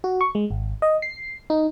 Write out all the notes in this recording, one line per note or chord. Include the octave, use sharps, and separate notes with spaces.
F#4
C#6
G#3
G#1
D#5
C7
D#4